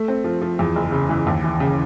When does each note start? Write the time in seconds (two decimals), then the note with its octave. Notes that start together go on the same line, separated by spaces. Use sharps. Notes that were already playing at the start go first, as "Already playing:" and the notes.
Already playing: A3
0.08 C4
0.24 F3
0.41 F3
0.59 E2
0.76 F#1
0.92 C#3
1.09 E3
1.27 D#2
1.44 E3
1.60 C#3